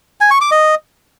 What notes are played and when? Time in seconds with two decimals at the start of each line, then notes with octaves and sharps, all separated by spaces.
0.21 G#5
0.31 C#6
0.41 D6
0.51 D#5